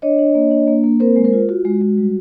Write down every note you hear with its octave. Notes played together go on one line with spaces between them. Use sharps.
D4 C#5 D#5
D4
A#3
D4
A#3
A#3
C4 A#4 C5
G#3
A#4 C5
F4
F4 F#4
G#3
G#3
G3